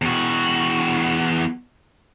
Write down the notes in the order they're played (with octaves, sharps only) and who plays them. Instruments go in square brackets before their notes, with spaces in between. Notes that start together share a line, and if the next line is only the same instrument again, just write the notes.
[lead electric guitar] E2 F#4